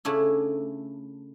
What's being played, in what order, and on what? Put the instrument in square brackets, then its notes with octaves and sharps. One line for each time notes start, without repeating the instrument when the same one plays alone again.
[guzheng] C#3 A3 D4 E4